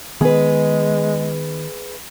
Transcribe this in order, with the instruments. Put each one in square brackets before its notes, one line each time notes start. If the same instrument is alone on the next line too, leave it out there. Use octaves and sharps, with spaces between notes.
[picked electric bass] D#3 B3 [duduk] G#3 [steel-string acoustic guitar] G#4 B4